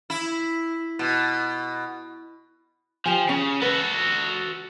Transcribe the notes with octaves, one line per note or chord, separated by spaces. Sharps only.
E4
B2
F3 G4 G#5
C#3 C#4
F#4 A4 B4